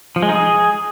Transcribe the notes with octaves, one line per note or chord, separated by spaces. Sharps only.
F3
G#3
D#4
G#4